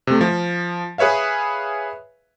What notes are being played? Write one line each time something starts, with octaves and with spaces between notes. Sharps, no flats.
C3 A3
F3
G#4 B4 C#5 E5 F5